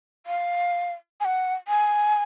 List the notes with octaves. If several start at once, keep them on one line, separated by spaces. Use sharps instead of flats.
F5
G#5
F#5
G#5